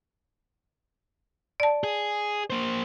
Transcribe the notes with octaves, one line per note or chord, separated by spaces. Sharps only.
D5 A5
G#4
A#3 C5